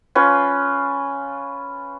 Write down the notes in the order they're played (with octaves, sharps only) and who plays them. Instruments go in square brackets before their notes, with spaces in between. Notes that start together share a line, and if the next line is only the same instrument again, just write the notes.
[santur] C#4 F4 B4